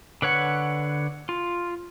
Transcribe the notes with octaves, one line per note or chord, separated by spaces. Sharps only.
D3 B4 C#5 F#5
F4